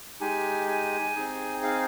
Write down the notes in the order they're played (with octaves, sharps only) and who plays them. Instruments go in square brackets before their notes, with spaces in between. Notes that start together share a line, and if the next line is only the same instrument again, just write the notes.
[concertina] G#3 D#4 G4 G#5
G#5
C4 D#4 G#4
F5